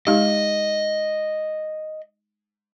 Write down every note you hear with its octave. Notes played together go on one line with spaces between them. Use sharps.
G#3 D#4 G4 D#5